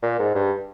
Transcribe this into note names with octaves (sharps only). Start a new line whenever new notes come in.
A#2
G#2
G2